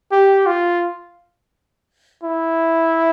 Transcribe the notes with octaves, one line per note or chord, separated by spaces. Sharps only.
G4
F4
E4